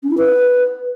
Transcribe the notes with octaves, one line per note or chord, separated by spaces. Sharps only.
C#4
E4
B4